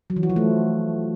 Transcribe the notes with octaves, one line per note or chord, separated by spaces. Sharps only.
F#3
E3
F#4
F3
A3